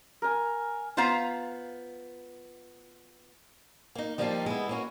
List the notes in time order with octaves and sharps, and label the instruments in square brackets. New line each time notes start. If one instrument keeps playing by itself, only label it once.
[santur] A#4 G#5
[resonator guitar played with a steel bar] B3 F4 C5 F5 A#5
[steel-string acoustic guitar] A#3 D#4
F3 G3 A#3 D4 D#4 G4
G#3 B3 E4
A#3 C#4 F#4